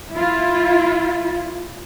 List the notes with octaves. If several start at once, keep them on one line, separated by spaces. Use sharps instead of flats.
E4 F4